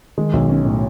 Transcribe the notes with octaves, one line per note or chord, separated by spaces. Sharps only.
D#3 G#3
B1
C#4
A2